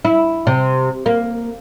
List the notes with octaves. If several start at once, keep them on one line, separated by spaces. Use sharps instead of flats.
E4
C3
A#3